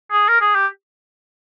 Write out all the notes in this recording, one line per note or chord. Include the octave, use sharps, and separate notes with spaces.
G#4
A#4
G#4
G4